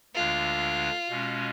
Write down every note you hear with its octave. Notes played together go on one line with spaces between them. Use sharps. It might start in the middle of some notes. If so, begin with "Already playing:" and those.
D2 D3 G#3 D4 F4
B2 G#3 C#4